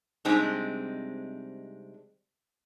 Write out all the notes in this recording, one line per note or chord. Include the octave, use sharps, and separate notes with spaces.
C3 G3 G#3 C4 D4 D#4